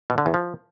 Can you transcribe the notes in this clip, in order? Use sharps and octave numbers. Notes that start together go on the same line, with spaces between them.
B2
D3
E2
F3